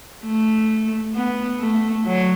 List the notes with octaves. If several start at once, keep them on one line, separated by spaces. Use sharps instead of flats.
A3
B3
A3
F#3